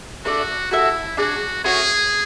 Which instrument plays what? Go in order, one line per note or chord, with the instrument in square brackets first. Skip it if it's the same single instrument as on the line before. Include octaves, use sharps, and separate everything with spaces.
[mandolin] A3 D4 A4 D5 [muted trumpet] F#4
[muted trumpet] E4 [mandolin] F#4 A4 E5
[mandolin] D4 G#4 D5 [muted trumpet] F#4
[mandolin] A3 C#4 F#4 C#5 [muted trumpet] G#4